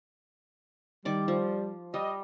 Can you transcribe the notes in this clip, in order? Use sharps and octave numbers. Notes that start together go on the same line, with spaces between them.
D#3 G3 D5 D6
F3
G3 D#5